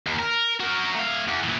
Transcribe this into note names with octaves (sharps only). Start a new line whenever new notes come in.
D#2
A#4
F#4 A#4
A3 F5
E2
A#2 E3